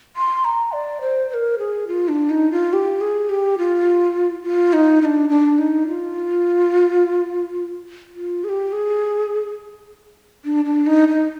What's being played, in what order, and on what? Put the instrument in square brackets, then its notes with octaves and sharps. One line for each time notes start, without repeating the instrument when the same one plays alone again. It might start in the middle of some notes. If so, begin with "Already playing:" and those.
[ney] C6
A#5
D5
C5
C5
A#4
G#4
F4
D4
D#4
F4
G4
G#4
G4
F4
F4
D#4
D#4
D4
D4
D#4
F4
F4
G#4
G4
G#4
D4
D4
D#4
D#4